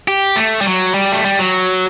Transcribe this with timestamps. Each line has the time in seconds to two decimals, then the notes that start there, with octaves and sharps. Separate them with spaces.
0.08 G4
0.36 A3
0.61 G3
0.66 F#3
0.94 G3
1.12 A3
1.25 G3
1.39 F#3